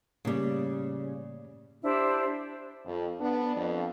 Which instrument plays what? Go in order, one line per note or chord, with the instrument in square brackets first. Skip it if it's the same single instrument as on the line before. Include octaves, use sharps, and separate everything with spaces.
[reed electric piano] A2 A#3 D5 [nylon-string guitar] C#3 G3
[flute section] D4 E4 G4 C5
[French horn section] F2
B3 D4
F2